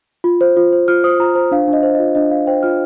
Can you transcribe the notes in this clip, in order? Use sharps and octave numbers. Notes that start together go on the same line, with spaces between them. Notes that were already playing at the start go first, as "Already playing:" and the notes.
F4
C5
F4
C5
F4 F6
C5 D#6
F4 A#5
C5 A#5
D4 F5
D4
D#5
C5
F4 D#5
D4 D#5
D4 F5
C5 G5
F4 F6